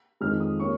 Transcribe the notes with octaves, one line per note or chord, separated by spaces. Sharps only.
F2 D#3 G#3 F6
D#6
G3 A#3 C#4 C#6